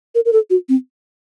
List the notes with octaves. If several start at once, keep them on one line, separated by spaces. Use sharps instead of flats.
A#4
A#4
A4
F#4
C4